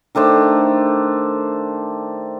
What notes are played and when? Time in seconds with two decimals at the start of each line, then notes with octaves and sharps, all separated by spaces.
0.15 D#3 A3 D4 C5